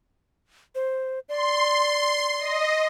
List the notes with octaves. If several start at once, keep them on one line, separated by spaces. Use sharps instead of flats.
C5
D5 C6
D#5